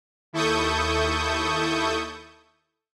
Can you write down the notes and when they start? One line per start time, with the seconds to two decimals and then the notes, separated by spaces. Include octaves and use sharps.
0.33 D#2 E4 A4 C#6 D#6 G6